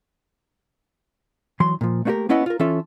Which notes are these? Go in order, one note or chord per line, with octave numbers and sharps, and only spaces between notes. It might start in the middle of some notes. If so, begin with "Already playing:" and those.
E3 F#3 C6
A#2 F3
A3 A#3 D4 F#4 G4 A#4
A#3 B3 C#4 E4 D#5 F#5
F4 A#4
E3 C#4 F4 A4 E5